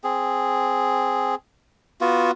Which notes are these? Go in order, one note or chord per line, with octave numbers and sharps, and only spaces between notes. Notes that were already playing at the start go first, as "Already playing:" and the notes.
C4 G#4
B3 F4 F#4